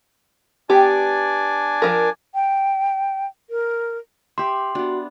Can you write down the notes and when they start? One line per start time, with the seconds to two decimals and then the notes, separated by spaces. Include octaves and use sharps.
0.69 B3 D4 G4 D5 G#5
1.82 F3 A3 A#4
2.34 G5
3.50 A#4
4.38 G4 E5 C6
4.75 B3 D4 F#4